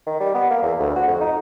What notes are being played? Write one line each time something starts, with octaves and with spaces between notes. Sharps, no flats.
D#3
G3
B3
A#3
E2
D2
F#4
F2
D#4